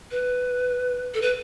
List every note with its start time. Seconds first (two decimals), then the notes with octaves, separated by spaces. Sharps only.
0.11 B4
1.14 A4
1.22 B4